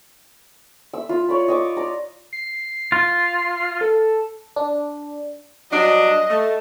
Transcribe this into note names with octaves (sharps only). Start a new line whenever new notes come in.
E5 E6
F4 F5
C#5 D5 B5
D#5 C#6 D6
D5 A#5
C7
F4
A4
D4
F#3 G3 D4 D#5
A3